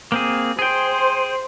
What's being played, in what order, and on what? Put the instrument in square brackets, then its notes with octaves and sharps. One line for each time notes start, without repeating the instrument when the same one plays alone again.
[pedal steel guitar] A#3 C4 G#4
[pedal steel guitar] G#4 G5 [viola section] C5